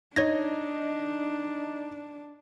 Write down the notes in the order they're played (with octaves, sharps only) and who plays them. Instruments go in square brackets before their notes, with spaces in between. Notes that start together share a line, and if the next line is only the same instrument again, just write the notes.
[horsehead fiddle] D4 [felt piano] D#4 D#5 [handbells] C#5 G#6 A#6